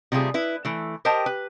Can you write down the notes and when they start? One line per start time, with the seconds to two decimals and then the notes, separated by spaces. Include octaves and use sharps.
0.12 C3 G3 A3 F4 G#4
0.34 E4 B4
0.65 E3 A3
1.05 G4 A#4 C5 D#5 G5 A5
1.26 B4